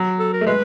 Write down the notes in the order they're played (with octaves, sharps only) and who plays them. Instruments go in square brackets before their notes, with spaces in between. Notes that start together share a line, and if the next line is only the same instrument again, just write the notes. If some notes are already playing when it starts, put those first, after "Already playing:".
Already playing: [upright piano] F#3
[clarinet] A4
A#4
[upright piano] A3
[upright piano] G#3 [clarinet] B4